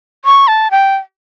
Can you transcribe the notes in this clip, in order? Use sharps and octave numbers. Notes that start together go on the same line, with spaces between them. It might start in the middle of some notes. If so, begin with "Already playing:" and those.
C#6
A5
G5